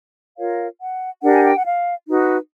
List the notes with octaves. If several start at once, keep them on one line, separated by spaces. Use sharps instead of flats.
F4 A#4 C#5 F5
F#5
D4 G4 A#4 F#5
G#5
G5
F#5
F5
D#4 F#4 B4